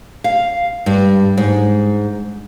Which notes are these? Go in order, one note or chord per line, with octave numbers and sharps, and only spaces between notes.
F5
G2
G#2